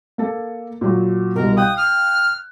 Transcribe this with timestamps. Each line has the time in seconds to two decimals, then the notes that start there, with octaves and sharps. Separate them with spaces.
0.18 A#3 A4
0.81 A#2 F#3
1.36 C2 B2 A#4
1.57 F5 G5 D#6 F#6
1.77 F6